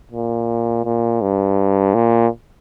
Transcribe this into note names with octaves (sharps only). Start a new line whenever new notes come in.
A#2
A#2
G2
A#2